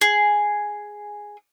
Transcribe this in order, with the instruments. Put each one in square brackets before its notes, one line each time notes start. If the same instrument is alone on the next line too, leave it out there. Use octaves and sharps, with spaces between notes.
[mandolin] G#4